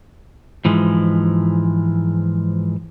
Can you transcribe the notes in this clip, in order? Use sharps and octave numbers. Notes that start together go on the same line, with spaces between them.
G#2 E3 F3 G#3